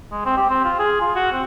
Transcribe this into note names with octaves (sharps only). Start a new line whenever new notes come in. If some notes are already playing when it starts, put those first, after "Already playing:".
G#3
C4
G4
C4
F4
G#4
F4
F#4
C4